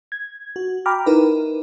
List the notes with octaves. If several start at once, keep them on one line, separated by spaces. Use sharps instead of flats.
G#6
F#4
G5 A#5 B5 D6 F6
D#4 E4 A#4 B4